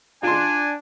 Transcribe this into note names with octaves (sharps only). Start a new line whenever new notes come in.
D4 F4 G#5 C6